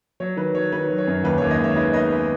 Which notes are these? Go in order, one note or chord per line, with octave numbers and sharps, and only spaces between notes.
F#3 C#5
D#3 B4
F#3 C#5
D#3 B4
F#3
C#5
F#2
D#2 B4
C#5
D#2
B4 D#5
G#3 C#5 E5
D#3 B4 D#5
B3 B4 D#5
B4